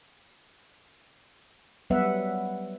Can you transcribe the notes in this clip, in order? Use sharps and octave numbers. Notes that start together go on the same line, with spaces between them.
F#3 G3 B3 B4 E5 F#5